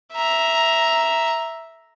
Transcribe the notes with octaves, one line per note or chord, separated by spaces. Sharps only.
E5 A#5